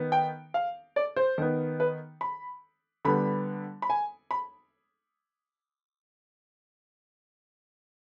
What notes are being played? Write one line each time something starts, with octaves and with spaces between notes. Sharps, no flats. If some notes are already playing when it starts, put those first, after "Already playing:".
Already playing: D#3 B3
G5
F5
D5
C5
D#3 B3
B4
B5
D3 G3 B3 B5
B5
G#5
B5